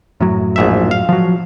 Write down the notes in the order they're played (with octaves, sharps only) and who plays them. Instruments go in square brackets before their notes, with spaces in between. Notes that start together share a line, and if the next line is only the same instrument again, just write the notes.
[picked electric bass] F#2 A2 F#3
[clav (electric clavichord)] A#1 G#2 E5
F5
[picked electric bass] F3 F#3